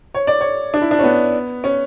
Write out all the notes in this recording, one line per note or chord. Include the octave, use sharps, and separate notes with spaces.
C#5
D5
C#5
D4
E4
D4
C#4
B3
C#4